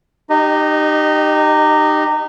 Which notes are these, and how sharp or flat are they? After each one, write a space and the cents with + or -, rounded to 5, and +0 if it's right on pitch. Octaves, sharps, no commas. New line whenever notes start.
D#4 -25 G4 +0 D#5 +0